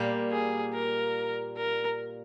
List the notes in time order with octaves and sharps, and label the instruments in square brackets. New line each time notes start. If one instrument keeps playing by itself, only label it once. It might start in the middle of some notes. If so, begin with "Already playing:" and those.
Already playing: [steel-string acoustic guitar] A#2 G3 A#3
[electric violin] G#4
A#4
A#4